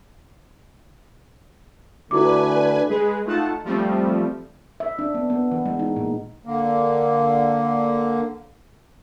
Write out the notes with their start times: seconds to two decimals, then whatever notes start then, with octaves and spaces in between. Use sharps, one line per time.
2.11 D3 A3 D4 E4 F#4 B4 G#5 D6
2.88 G#3 G#4 B4
3.25 A3 D#4 F4 F#5 A5
3.64 F3 G3 A3 C4
4.80 E5
4.99 D4
5.15 B3
5.30 B3
5.52 E3
5.66 G#3
5.79 D#4
5.96 A#2
6.45 D3 A#3